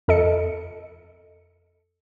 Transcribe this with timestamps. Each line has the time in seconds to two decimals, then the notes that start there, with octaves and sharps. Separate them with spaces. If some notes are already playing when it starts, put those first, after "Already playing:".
0.08 F2 A4 D#5 C#7